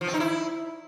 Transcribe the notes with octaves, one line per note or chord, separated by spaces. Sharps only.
F3
C4
D#4
E4